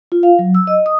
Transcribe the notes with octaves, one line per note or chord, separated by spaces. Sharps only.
F4
F5
F#3
E6
D#5
D#6